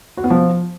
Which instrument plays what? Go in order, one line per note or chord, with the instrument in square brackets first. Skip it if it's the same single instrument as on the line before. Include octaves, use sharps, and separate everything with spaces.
[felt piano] F#4
B3
F3